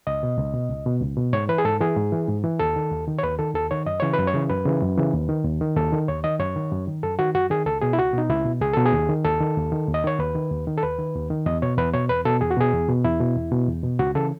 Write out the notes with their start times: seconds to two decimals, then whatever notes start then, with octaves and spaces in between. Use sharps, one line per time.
0.07 C#2 D#5
0.23 B2
0.38 C#2
0.54 B2
0.70 C#2
0.86 B2
1.02 C#2
1.17 B2
1.33 G#2 C#5
1.49 E3 B4
1.58 G#4
1.65 G#2 A4
1.81 E3 G#4
1.96 G#2
2.12 E3
2.28 G#2
2.44 E3
2.60 D#2 A4
2.76 D#3
2.91 D#2
3.08 D#3
3.18 C#5
3.23 D#2 B4
3.39 D#3 A4
3.55 D#2 A4
3.71 D#3 C#5
3.86 F#2 D#5
4.00 C#3 E3 C#5
4.14 F#2 B4
4.27 C#5
4.34 C#3 E3
4.49 F#2 B4
4.66 C#3 E3
4.82 F#2
4.97 C#3 E3
5.13 D#2
5.29 D#3
5.45 D#2
5.61 D#3
5.76 D#2 A4
5.93 D#3
6.08 D#2 C#5
6.24 D#3 D#5
6.40 F#2 C#5
6.56 D#3
6.71 F#2
6.87 D#3
7.03 F#2 A4
7.19 D#3 F#4
7.35 F#2 F#4
7.50 D#3 G#4
7.66 C#2 A4
7.82 B2 G#4
7.93 E4
7.98 C#2 F#4
8.13 B2 D#4
8.30 C#2 E4
8.45 B2
8.61 C#2 G#4
8.73 B2 A4
8.85 G#4
8.93 D#2
9.09 D#3
9.25 D#2 A4
9.40 D#3
9.57 D#2
9.72 D#3
9.88 D#2
9.94 D#5
10.04 D#3 C#5
10.19 D#2 B4
10.35 D#3
10.51 D#2
10.67 D#3
10.78 A4
10.83 D#2 B4
10.99 D#3
11.15 D#2
11.30 D#3
11.46 E2 D#5
11.62 B2 C#5
11.78 E2 B4
11.94 B2 C#5
12.09 E2 B4
12.25 B2 A4
12.41 E2 G#4
12.51 F#4
12.57 B2 G#4
12.73 E2
12.89 B2
13.04 E2 E4
13.20 B2
13.36 E2
13.52 B2
13.68 E2
13.83 B2
13.99 C#2 F#4
14.15 C#3 E3 A4